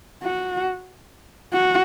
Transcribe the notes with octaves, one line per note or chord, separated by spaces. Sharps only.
F#4
F#4